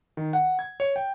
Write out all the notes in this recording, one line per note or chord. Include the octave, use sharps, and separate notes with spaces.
D#3
F#5
G#6
C#5
G5